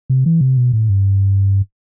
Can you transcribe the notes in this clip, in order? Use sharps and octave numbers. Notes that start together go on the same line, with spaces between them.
C3
E3
C3
B2
A2
G2